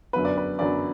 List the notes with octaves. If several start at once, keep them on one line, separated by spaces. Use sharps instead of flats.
F#2 D3 F#3 B3 B4
D5
B4
F#2 D3 F#3 B3 D5